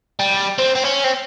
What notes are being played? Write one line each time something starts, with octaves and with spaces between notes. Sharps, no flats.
G3
C4
C4
C#4
C4